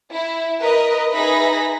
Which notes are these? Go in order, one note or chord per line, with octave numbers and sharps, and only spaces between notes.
E4
A#4 B4 D#5
D#4 G#4 B4 E5 B5 A#6